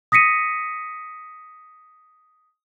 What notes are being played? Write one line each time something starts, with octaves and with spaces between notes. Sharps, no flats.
D#6 A#6 B6 C#7 D#7